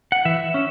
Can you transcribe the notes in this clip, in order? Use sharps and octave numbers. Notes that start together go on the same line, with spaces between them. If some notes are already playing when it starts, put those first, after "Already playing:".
F#5
E3 E5
C#4